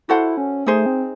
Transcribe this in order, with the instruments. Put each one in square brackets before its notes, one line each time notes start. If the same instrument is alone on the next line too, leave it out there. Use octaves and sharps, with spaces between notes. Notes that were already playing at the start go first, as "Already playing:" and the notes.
[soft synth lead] E4 [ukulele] F#4 A4 C5 F#5
[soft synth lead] C#4
[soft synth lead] A3 [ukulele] D#4 G#4 C5
[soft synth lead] C4